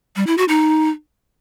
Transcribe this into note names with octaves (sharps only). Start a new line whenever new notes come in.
G3
E4
F#4
D#4